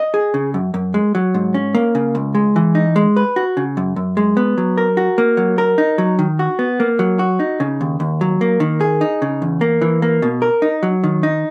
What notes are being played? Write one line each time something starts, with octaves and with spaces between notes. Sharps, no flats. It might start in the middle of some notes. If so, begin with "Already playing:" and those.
Already playing: D#5
G#4
C#3
F#2
F#2
G#3
F#3
G#2
C#4
A#3
C#3
C#2
G#3
E3
D#4
G#3
B4
F#4
C#3
F#2
F#2
G#3
B3
F#3
A#4
F#4
A#3
F#3
A#4
D#4
F#3
D#3
F#4
B3
A#3
F#3
F#4
D#4
C#3
D#2
D#2
F#3
A#3
D#3
G#4
D#4
C#3
E2
A#3
E3
A#3
B2
A#4
D#4
F#3
D#3
D#4